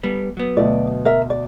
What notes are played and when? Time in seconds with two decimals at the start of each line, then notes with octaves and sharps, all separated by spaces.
0.03 G3 B3
0.37 F#3 B3
0.57 D2 B2 D5 D#5
1.05 A#4 E5
1.30 D5